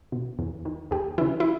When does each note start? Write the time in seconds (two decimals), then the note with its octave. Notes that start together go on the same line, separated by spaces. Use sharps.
0.12 B2
0.39 E2
0.65 D#3
0.91 D#2 G4
1.18 C#3 E3 E4
1.40 E4